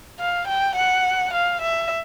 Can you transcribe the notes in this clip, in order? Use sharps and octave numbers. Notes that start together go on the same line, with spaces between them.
F5
G5
F#5
F5
E5